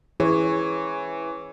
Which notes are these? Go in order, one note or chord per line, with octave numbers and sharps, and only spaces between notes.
E3 G#4 C#5